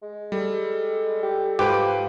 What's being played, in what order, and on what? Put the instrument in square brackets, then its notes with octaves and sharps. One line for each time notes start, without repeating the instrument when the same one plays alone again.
[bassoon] G#3
[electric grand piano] G3 [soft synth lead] A4
[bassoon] G4
[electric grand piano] G#2 B4 D7 [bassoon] F3 [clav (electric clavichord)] G4